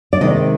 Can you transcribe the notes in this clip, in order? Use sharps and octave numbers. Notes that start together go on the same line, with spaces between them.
D5
C3 D#3 G#3 D#5